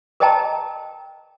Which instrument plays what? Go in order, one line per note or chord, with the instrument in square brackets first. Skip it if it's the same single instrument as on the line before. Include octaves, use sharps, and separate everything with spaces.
[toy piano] A#4 C5 D#5 G5 A5 A#5